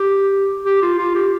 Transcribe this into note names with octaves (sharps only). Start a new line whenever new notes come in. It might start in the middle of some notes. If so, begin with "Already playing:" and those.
Already playing: G4
G4
F4
F4
G4